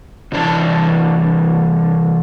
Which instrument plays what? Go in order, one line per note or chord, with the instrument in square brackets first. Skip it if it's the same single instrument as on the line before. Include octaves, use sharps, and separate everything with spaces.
[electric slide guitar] C3 E3 D4 A#4 A5